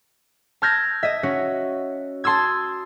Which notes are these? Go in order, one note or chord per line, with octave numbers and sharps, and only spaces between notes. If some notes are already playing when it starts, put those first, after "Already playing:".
A5 E6 F6 G6 G#6 A#6
D#5 E5
C#4 F#4
A5 C6 D#6 E6 G#6